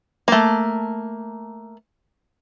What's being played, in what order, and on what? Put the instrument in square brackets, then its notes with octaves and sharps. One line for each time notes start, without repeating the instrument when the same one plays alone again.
[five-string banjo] A3 A#3